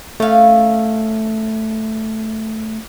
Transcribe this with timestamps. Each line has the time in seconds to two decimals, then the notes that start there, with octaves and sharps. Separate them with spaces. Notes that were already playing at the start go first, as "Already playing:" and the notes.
0.20 A3 C#4 F5